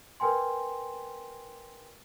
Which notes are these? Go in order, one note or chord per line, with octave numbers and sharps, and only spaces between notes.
A#4 B4 G5 G#5 C6